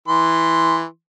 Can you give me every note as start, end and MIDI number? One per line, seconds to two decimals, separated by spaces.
0.08 0.84 52
0.08 0.84 84